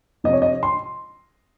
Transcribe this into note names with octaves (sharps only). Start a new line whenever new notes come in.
F2 C3 F3 D#5
C#5
D#5
C6